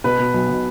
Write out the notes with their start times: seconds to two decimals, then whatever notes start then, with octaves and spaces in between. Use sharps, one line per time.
0.04 B2 B4
0.19 B2
0.34 B1
0.49 B2